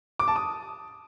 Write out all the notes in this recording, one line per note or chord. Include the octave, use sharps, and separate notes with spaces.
D6
A5
D#6